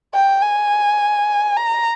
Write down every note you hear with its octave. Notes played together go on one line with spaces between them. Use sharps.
G5
G#5
A#5